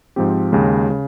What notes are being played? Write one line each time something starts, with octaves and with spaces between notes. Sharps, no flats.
G#2 F3 C4 G4
D#2 C#3 G#3
C#3